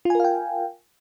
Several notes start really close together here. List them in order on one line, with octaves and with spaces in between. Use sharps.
F4 G#5 A#4 F5 G5